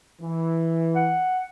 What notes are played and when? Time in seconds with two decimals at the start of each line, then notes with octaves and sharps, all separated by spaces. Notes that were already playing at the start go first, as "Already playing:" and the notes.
0.21 E3
0.96 F#5